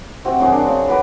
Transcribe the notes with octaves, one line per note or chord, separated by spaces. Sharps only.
C3 C4 F#4
F#2 D#3 F#4 G#4
D4
C#3 D#4
F#4 B4 D6